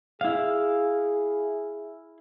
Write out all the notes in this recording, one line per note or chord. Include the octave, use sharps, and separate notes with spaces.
E4 G#4 F5